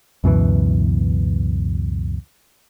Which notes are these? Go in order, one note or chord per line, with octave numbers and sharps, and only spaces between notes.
C#2 F#2 B2 E3